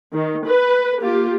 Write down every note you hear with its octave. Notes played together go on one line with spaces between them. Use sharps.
D#3
B4
A#3 F4 G4